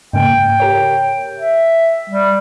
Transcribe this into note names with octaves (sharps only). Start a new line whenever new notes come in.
G#2 C#3 A#3 G5
G4 A#4 C#5
E5
G3